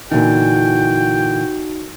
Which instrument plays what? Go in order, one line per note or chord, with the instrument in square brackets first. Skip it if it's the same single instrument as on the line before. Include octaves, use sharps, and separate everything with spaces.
[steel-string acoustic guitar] A#2 D3 E3 [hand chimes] D#4 [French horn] F#4 [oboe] G5